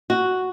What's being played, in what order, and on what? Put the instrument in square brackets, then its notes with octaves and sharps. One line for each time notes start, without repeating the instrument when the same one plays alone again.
[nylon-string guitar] F#4